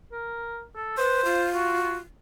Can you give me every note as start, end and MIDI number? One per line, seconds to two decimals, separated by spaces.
0.12 0.63 70
0.76 0.95 69
0.98 1.24 71
0.98 1.48 72
1.25 1.96 65
1.55 1.98 66